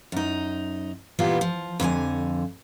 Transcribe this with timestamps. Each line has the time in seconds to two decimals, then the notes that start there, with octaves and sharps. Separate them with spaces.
0.12 F#2 D#4
1.19 A#2 E3 G3 B3 F4
1.41 F3
1.80 F2 D3 F4 G#5